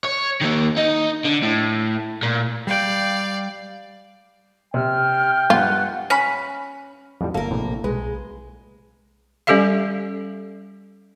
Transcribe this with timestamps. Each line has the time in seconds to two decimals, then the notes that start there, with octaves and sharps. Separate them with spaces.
0.05 C#5
0.42 D#3 A#3
0.78 D#4
1.26 D3
1.43 A2
2.23 A#2
2.67 G3 D5 F5 G5
4.74 C3 G5 F6
5.50 G2 F4 F#5
6.10 C#4 B5
7.21 F2 A2 F#3 G3
7.34 G1 A#3 A4 A#4 F5
7.51 A#1 A2 C3
7.84 B1 G#3 B4
9.47 G3 C#4 G4 A4 E5 F5